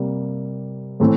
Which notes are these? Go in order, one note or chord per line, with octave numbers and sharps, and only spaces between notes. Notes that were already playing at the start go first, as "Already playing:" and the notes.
Already playing: C3 G3 A#3
A2 E3 A3 C4